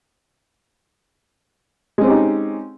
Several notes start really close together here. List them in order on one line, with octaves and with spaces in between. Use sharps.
G#3 C#4 C4 G4 D#4